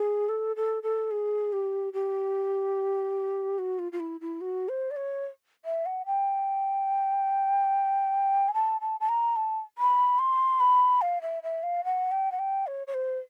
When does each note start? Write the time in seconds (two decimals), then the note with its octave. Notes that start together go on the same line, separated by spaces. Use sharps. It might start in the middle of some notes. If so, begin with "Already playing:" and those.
Already playing: G#4
0.29 A4
0.56 A4
0.83 A4
1.11 G#4
1.53 G4
1.93 G4
3.58 F#4
3.79 F4
3.92 F4
4.00 E4
4.21 E4
4.41 F#4
4.69 C5
4.91 D5
4.96 C#5
5.65 E5
5.86 F#5
6.06 G5
8.48 G#5
8.54 A5
8.81 A5
9.00 A5
9.09 A#5
9.36 A5
9.78 B5
10.19 C6
10.60 B5
11.02 F5
11.22 E5
11.43 E5
11.63 F5
11.85 F#5
12.12 G5
12.32 F#5
12.39 G5
12.67 C#5
12.87 C#5
12.94 C5